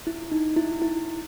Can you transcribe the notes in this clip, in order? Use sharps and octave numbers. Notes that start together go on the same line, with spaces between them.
E4
D#4
E4
E4